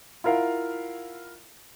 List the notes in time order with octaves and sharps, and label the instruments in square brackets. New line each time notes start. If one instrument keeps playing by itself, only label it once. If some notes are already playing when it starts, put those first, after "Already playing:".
[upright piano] E4 F4 A#4 F5 F#5